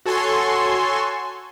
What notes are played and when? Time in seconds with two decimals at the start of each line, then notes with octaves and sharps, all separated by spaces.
0.06 F#4 A4 C#5 G#5 C6 C#6